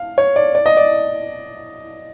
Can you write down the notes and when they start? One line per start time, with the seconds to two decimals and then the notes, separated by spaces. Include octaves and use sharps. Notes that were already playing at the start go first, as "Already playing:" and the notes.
Already playing: F5
0.18 C#5
0.36 D5
0.55 D5
0.66 D#5
0.77 D5